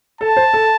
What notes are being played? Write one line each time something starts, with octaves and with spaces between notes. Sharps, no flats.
A4 A5
C5
A4